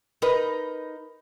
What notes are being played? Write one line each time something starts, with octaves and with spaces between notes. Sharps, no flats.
D#4 A#4 B4